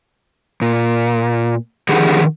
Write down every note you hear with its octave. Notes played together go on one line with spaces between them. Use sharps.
A#2
D3 D#3 F3 G4 G#4 F#5